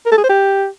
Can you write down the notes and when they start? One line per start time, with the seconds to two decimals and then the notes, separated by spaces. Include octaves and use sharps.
0.06 A#4
0.12 A4
0.17 G#4
0.23 C5
0.29 G4